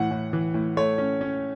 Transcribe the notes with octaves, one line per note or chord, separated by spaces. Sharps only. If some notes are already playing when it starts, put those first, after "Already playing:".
Already playing: A2 E3 F#5
A2
E3
A2
A3 C#5
C#4
C#4